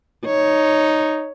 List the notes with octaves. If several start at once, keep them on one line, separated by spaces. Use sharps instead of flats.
D#4 C#5